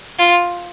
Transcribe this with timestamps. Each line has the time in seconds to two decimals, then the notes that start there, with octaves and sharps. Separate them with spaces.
0.19 F4